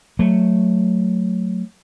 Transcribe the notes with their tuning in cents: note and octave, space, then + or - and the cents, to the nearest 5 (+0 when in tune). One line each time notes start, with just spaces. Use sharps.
F#3 -5 A3 +0